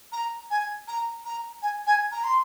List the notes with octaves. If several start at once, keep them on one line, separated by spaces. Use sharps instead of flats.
A#5
G#5
A#5
A#5
G#5
G#5
A#5
C6